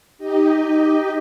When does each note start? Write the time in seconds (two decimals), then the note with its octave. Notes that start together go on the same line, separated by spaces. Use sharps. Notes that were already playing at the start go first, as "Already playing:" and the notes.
0.18 D#4 G4 D#5